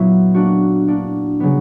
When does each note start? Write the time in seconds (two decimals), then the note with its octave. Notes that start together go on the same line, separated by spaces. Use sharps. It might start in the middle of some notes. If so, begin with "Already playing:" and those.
Already playing: A#2 F#3 B3 E4
0.34 A#3 D4 F#4
0.87 A#3 D4 F#4
1.40 C#3 F#3 B3